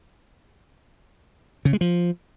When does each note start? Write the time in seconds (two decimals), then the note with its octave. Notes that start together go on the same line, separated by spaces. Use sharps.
1.65 C#3
1.73 G#3
1.81 F3